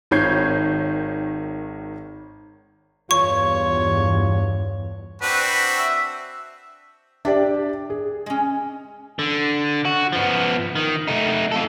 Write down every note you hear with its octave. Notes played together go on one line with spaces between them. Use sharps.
G#1 D#3 C#5 G6 G#6 C7
E2 G2 F4 C#5 C#6
C4 D4 F#4 B4
E5
D4 G4 D5 E5
G#4
G#3 C#4
D3
F#4
F3 B3
D#3
A3 D#4
F4 A4